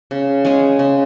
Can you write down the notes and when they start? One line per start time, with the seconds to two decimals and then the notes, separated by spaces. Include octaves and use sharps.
0.11 C#3
0.45 G#3 C#4 G#4
0.79 C#3